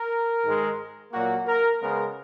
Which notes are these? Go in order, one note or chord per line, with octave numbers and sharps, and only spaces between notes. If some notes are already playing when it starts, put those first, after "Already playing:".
Already playing: A#4
G#2 D#3 G#3
A#2 F#3 A#3 F#4
A#4
C#3 G#3 B3 A#4